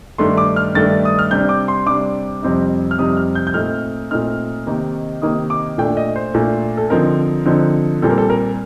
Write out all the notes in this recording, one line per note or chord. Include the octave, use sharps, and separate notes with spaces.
G2 D#3 A3 D4 C6
D6
F6
G2 D#3 A3 D4 A6
D#6
F6
C3 G3 D4 G6
D6
C6
C3 G3 D4 D6
F2 C3 G3 C4 D#4
F6
F2 C3 G3 C4 D#4 D#6
F6
G6
G6
A#2 A3 C4 D#4 F6
A#2 A3 C4 D#4 F6
C3 D#3 A#3 D#4
C3 D#3 A#3 D#4 D#6
D6
A#2 A3 D4 G5
D#5
C5
A#2 A3 D4
A4
D3 F3 C4 D#4 A#4
D3 F3 C4 D#4
A#2 G3 C4 A4
A#4
A4
A#4